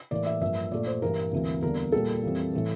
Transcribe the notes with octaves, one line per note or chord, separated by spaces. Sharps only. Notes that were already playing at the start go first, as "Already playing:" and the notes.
A2 E3 A#3 D5
E5
G2 F3 A#3 E5
A#2 A3 D5
C5
G2 E3 G3 A#3 A#4
D2 C3 E3 A#3
E2 D3 G3 A#3 A#4
A#2 G3 A#3 A4
F2 E3 G3 A#3
A2 E3 A3